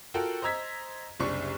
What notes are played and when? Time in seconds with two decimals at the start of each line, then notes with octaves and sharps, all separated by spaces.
0.14 F4 F#4 A4 A#4 G5
0.42 C5 D#5 A#5 E6 G#6 B6
1.20 F#1 C2 D4 C#6